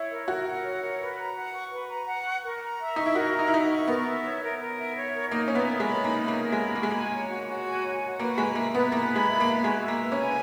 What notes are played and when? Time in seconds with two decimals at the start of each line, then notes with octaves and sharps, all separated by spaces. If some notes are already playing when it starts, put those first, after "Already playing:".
Already playing: E4 C#5
0.09 A#4
0.28 F#4 A#4
0.45 F#5
0.64 C#5
0.81 A#4
0.99 B4
1.18 A#5
1.35 F#5
1.54 C#6
1.71 B4
1.89 A#5
2.07 F#5
2.25 C#6
2.43 A#4
2.62 A#5
2.80 E5
2.96 D#4 C#6
3.06 E4
3.15 F#4 A#4
3.33 A#5
3.39 D#4
3.47 E4
3.52 D#4 E5
3.70 C#6
3.87 B3 A#4
4.06 E5
4.24 C#5
4.42 A#4
4.60 A#4
4.78 E5
4.95 C#5
5.14 A#4
5.31 A#3 D#4
5.48 C#4 E5
5.55 B3
5.68 A#4
5.80 G#3
5.85 B5
6.03 A#3 D#4
6.22 E5
6.28 A#3
6.39 A#4
6.52 G#3
6.58 B5
6.75 A#3 F#4
6.83 G#3
6.91 A#3 G#5
7.12 C#5
7.30 F#4
7.48 F#4
7.66 G#5
7.84 C#5
8.02 F#4
8.19 A#3 B4
8.38 G#3 B5
8.55 A#3 E5
8.74 B3 B4
8.92 A#3 B4
9.10 B5
9.16 G#3
9.27 E5
9.40 A#3
9.46 B4
9.64 G#3 F#4
9.82 E5
9.88 A#3
10.00 B4
10.12 C#4
10.18 G#5